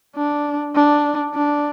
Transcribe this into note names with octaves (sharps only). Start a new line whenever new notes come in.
D4
D4
D4